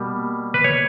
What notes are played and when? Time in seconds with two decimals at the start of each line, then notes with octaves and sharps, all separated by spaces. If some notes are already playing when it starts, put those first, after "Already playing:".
Already playing: B2 G3 A#3
0.54 B4
0.64 C#5